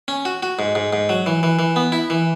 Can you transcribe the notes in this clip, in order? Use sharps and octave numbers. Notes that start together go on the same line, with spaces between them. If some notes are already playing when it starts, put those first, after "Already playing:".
C#4
F#4
F#4
G#2
G#2
G#2
F#3
E3
E3
E3
B3
E4
E3